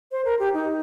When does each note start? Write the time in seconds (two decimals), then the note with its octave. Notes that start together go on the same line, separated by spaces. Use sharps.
0.12 C5
0.25 A#4
0.39 G4
0.54 D#4